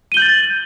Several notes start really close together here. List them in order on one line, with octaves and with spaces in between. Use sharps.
D#7 G7 G6 F#7 A6